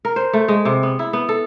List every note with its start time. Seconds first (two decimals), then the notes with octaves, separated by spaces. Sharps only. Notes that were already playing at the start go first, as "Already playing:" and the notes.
0.05 A#4
0.16 C5
0.33 A3
0.48 G#3
0.65 C3
0.83 B3
0.99 E4
1.13 B3
1.29 A4